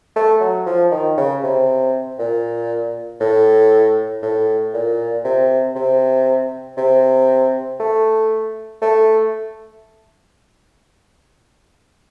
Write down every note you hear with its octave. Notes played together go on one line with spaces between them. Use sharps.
A3
F#3
F3
D#3
C#3
C3
A#2
A2
A2
A#2
C3
C3
C3
A3
A3